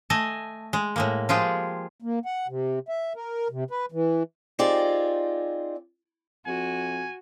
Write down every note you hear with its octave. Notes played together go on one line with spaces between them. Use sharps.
A3 D#5 G#5 A5
G#3
A2 G#3 A#3
F3 G#3 F4 G4 G#4
A#3
F#5
C3
E5
A#4
C3
B4
E3
C4 D#4 F4 G4 G#4 D5
F2 F#4 G#5